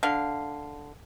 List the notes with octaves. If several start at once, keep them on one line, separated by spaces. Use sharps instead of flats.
D3 F5